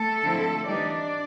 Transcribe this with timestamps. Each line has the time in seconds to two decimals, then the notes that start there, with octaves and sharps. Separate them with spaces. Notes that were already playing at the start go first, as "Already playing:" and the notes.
Already playing: A3 A4
0.23 D3 F3 G#3 C4 E4
0.66 E3 G3 C4 D4 D#4 D5